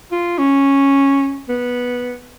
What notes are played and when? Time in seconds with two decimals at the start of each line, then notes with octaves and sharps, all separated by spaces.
0.12 F4
0.38 C#4
1.49 B3